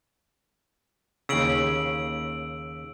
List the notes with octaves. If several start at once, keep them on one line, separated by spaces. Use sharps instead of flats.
D#2 C#3 E6 D7 F#7